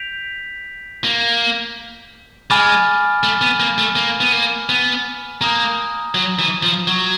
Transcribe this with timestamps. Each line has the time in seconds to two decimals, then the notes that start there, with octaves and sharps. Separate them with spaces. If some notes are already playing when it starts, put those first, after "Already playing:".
Already playing: G6 B6 D7 F7
1.04 A#3
2.50 G#3 G#5 B5 D6 F6 A6
3.23 A3
3.41 B3
3.60 A#3
3.78 A3
3.96 A#3
4.21 B3
4.32 A#3
4.69 B3
5.41 A#3 A#5 D#6 G6
6.15 F#3
6.39 E3
6.63 F3
6.87 F#3